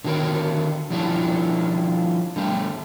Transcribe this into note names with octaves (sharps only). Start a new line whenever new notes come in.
D3 D#3 F#4 A4 A#4 C#5
F3 G3 C#4 D4 E4
D3 G3 A3